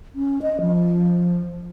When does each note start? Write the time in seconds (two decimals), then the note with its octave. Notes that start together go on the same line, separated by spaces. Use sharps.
0.15 C#4
0.42 D#5
0.61 F3